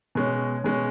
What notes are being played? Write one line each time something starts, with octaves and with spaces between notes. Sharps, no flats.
B2 G#3 C#4
B2 G#3 C#4